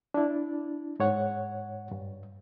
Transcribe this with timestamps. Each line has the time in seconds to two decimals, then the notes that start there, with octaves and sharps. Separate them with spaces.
0.14 D4 E4
1.00 G#2 C#5 F#5
1.91 G2